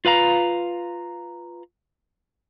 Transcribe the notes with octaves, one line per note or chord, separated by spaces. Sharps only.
F4 B4 F5 A#5